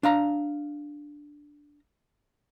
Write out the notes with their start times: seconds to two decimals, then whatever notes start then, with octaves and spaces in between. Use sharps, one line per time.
0.03 D4 F5 A#5